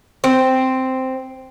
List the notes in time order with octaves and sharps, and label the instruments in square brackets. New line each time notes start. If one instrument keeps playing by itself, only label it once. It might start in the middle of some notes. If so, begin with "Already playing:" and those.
[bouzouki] C4